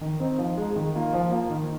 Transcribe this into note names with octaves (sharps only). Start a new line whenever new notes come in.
D#3
C4 D#4
F3
G#3 D#4
D#3
A#3 F4
F3
A#3 F4
D#3